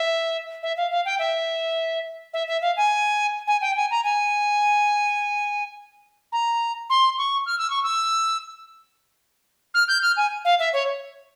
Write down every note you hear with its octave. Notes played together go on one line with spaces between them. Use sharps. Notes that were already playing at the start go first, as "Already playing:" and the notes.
Already playing: E5
E5
F5
F5
G5
E5
E5
E5
F5
G#5
G#5
G5
G#5
A#5
G#5
A#5
C6
C#6
F6
E6
C#6
E6
F6
G6
F6
G#5
F5
E5
C#5